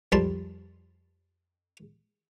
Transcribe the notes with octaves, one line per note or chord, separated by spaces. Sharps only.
F2 G3 A#4 A5 B5 C6